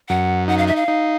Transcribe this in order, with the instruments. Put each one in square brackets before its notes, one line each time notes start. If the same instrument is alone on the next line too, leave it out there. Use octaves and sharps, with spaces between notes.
[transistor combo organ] F#2 [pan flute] F#5
[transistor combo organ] D#4 [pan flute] F#5
[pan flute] F5
E5
F5
[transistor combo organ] D#4